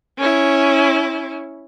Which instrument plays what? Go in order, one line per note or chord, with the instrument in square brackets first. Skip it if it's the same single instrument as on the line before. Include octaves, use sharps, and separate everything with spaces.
[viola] C#4 E4